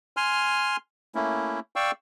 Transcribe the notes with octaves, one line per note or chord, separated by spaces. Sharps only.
G#5 C6 F6
A3 A#3 C#4 E4
D5 F5 G5 C#6 E6